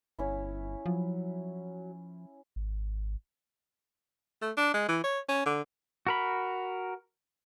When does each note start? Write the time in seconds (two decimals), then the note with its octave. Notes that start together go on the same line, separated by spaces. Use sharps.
0.19 G1 C#4 E4
0.86 F3 F#3
2.56 G#1
4.42 A3
4.57 D4
4.74 G#3
4.88 E3
5.04 C#5
5.29 C#4
5.46 D3
6.07 F#4 A#4 B5